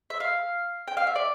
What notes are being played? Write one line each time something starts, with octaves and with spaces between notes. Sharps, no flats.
E5
F5
G5
F5
E5
D5